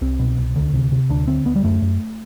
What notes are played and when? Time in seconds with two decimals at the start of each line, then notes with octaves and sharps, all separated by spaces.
0.01 C2 C4
0.19 B2
0.38 C2
0.56 D2
0.74 C3
0.92 C3
1.09 D2 D4
1.27 D3 C4
1.45 D2 B3
1.56 G3
1.64 F#2 A3
1.82 F#2